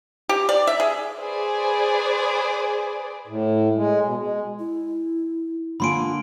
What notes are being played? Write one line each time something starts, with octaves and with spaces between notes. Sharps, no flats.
G4
D5
E5
G#4
G#4 B4 C5 D5
A2
G#3
B2
G#3
E4
D3 A#3 F4 G#5 B5 C6 D7